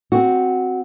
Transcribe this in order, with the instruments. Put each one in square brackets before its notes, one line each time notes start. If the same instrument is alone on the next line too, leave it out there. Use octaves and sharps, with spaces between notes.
[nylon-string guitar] C4 F#4